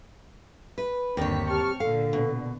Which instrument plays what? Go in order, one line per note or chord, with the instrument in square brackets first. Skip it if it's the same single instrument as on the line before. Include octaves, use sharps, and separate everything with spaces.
[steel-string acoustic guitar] B4
[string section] G1 D3 B6 [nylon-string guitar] D#2 [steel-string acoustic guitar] C4 C#5
[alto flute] G4 [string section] A5 C#6 F6
[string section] A#2 D3 [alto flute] A4 [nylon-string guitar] F5
[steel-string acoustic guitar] B2